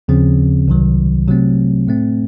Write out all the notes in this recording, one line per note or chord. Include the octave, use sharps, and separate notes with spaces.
D#2 C#3 F3 C4
C2 C3 D#3 F#3
C3 F#3 A3 C4
A2 A3 C4